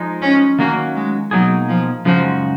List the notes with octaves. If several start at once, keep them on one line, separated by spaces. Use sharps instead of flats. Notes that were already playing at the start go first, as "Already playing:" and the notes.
Already playing: F3 G#3 D#4
C#4
D#3 F#3 A#3 C#4 F#4
G#3
B2 F#3 A#3 D#4 G#4
F3
F#2 C#3 F3 G#3 D#4 F#4